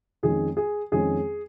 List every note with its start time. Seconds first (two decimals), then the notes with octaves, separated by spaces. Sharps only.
0.23 F2 D#3 G#3 C#4 G#4
0.57 G#4
0.92 F2 D#3 G#3 C#4 G#4